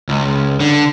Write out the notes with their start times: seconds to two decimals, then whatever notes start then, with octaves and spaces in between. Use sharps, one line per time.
0.09 C#2
0.60 D3